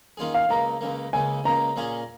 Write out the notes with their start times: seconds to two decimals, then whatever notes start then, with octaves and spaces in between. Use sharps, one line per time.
0.17 D#3 A#3 C#4 F4 G#4
0.34 F5
0.49 C#2 C#3 A#3 A#5
0.81 C#2 C#3 A#3
1.13 C#2 C#3 A#3 G#5
1.44 C#2 C#3 A#3 A#5
1.76 A#2 A#3 C#4 G#4 C#5